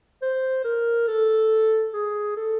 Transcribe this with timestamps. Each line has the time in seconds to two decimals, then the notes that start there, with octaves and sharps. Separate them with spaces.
0.22 C5
0.65 A#4
1.08 A4
1.94 G#4
2.37 A4